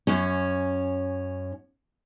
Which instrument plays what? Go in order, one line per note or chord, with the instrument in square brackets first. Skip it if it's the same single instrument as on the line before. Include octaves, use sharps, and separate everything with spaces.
[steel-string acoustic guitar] F#2 C#4